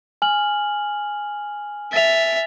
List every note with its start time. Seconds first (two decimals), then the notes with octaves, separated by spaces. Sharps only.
0.22 G#5 F6 F#7
1.93 E5 A6 F7